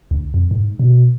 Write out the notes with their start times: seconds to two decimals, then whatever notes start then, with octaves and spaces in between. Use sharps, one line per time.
0.11 D2
0.34 F2
0.51 G#2
0.79 B2